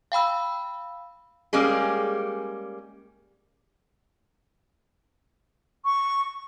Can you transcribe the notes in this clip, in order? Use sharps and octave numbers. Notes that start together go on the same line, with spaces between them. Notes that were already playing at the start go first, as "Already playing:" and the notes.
F5 G5 B5 E6
G3 G#3 A#3 C#4 G#4
C#6